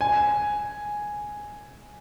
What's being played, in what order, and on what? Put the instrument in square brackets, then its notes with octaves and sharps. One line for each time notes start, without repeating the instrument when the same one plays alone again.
[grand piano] G#5